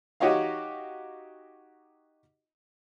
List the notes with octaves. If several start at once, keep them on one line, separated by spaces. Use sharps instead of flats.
D#4 F#4 G4 C#5 D#5 F5